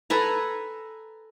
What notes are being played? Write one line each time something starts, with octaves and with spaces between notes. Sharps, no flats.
A4 B4 G#5 A#5